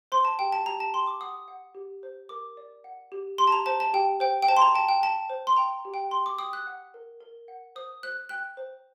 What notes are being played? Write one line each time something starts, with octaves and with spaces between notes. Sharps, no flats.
C5 C6
A5
G4 G5
A5
G4 A#5
A5
G5 C6
D6
F#5 D#6
F#5
G4
C5
A#4 D6
D5
F#5
G4
G4 C6
A5
A#5
C5 A5
A5
G4 G5
C5 G5
G5
C5 A5
C6
A#5
G5 A5
G5
G5 A5
C5
C6
G5 A#5
G4
G5
G5 C6
D6
G5 D#6
F#6
F#5
A#4
A#4
F#5
C5 D#6
C5 F#6
G5 F#6
C5